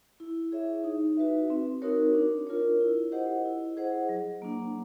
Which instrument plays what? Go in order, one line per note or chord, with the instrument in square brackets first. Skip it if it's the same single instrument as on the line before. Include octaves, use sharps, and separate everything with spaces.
[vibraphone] E4
G#4 C#5 E5
D#4
F#4 B4 E5
C4
D#4 F#4 A#4 C#5
D4
F4 A#4 C#5
E4
G4 C5 D#5 F#5
E4
G#4 C5 D#5 F#5
F#3
A#3 D4